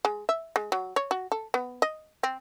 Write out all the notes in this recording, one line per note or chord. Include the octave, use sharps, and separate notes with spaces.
G#3
E5
G#3
F#3
C#5
F#4
A4
B3
D#5
C4